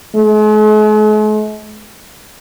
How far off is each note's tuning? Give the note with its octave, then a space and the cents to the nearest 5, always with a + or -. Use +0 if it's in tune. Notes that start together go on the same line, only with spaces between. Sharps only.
G#3 +45